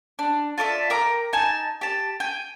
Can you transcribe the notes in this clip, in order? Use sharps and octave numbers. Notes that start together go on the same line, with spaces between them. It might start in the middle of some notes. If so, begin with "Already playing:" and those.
D4
F4 A4 D5 E5
A#4 G5 A#5 D6
D#4 G#5 A5
G4 A5
G5 G#5